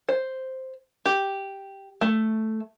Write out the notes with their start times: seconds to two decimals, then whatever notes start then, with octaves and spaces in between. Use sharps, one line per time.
0.09 C5
1.06 G4
2.01 A3